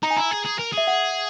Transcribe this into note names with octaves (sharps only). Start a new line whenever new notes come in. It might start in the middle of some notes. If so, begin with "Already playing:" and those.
D#4 A#5
G#5
E4 A#5
G#4
G#4
A#4
G#4 E5
F#5